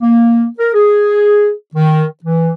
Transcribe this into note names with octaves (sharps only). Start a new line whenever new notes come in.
A#3
A#4
G#4
D#3
E3